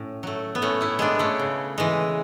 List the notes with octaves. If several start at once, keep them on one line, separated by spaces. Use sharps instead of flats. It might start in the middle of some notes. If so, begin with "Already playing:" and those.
Already playing: A2 C#4
F#3 A3
B3
A2 A3 C#4
C#4 E4
G#3 B3 D4
A3 C#4
C#3
E3 G#3